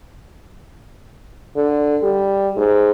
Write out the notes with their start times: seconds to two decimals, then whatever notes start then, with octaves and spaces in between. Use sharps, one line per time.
1.56 D3
2.03 G3
2.56 G#2